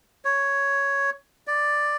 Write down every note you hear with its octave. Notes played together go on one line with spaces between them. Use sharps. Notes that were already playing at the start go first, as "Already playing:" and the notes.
C#5
D5